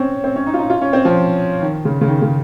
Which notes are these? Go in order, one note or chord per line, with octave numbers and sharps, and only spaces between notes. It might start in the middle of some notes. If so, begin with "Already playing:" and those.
Already playing: C4 C#4
C4
C#4
D#4
F4
D#4
F4
C#4
C4
F3
D#3
C#3
C#3
D#3
C#3